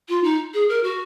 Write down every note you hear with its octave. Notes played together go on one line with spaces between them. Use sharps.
F4
D#4
G#4
A#4
F#4